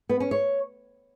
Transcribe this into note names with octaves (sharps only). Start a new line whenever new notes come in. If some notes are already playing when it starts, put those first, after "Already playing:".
B3
C#4
C#5